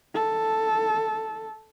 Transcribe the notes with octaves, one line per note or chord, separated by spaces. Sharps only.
A4